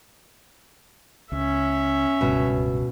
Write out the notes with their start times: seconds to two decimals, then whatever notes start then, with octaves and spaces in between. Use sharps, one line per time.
1.32 C#2 C#4 E5
2.21 D1 C#2 G2 B2